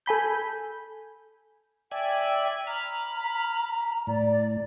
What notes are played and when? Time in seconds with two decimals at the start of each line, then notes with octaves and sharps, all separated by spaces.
0.06 A4 G#5 B5 G6
1.91 D5 E5 G5 G#5
2.67 A#5 B5 F6
4.07 A2 D5